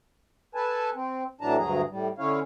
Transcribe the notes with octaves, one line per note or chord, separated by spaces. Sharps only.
A4 B4 G#5 A5
C4
A2 E3 F#3 D4 A5 A#5
D2 G2 F#3 G#4 A#5
A2 G3
D3 C#4 E4 C#5 F5